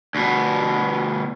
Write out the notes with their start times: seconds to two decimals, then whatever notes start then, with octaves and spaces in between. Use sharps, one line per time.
0.15 D2 B2